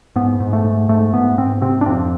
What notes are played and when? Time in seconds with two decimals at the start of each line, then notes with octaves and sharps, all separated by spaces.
0.16 G#2 B3
0.40 G#2
0.53 A3
0.64 G#2
0.89 G#2 A3
1.13 G#2 B3
1.38 G#2 C4
1.61 C3 C4
1.81 D4
1.86 F2 C4